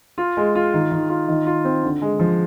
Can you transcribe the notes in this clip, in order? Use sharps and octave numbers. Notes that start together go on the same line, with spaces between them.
F4
G#3
F4
D#3
D#3
F4
D#3
F4
C4
D3
G#3
F3